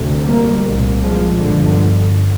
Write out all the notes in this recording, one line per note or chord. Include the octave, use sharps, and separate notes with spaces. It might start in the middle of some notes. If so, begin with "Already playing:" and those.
Already playing: D2 C3
G3 A#3
C2 A#2
F3 G#3
G1 G2 D3 F3